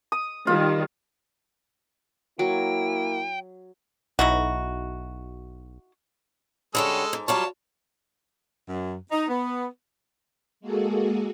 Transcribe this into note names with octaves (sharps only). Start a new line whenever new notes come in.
D#6
D#3 G3 F4
F#3 A#3 E4 G5
B1 D#4 E4 F#4
D3 G3 G#3 C#4 A4 E6
G#2
F#3 G3 F4 C#5 A5
F#2
D#4
B3
G#3 A#3 F#4 G#4 A4